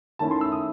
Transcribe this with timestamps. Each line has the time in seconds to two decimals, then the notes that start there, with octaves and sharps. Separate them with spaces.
0.19 D#3 A3 C#4 E4 A5
0.31 C6
0.41 E6
0.52 D#6